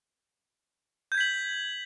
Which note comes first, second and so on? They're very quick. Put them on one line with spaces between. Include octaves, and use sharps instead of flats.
G6 G#6 B6 F#7